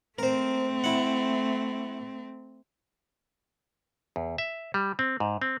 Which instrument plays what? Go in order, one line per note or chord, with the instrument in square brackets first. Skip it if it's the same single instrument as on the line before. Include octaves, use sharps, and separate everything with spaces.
[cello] A3 C4 [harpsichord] A#4 C5
[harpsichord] E4 F#5
[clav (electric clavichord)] E2
E5
G3
C4
G#2
C4